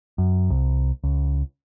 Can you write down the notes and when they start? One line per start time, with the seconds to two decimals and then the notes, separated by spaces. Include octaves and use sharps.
0.18 F#2
0.50 C2
1.04 C#2